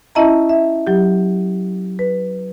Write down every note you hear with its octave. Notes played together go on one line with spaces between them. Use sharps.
C#4 E4 D#5 E5 A5 A#5
E5
F#3 G4
B4